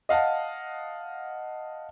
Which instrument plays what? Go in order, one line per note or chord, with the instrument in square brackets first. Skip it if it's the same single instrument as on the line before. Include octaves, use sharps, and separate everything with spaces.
[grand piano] D#5 F5 F#5 A5